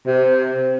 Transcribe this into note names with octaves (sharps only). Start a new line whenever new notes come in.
C3